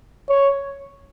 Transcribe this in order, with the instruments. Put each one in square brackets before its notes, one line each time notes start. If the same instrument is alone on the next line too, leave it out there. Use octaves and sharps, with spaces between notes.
[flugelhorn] C#5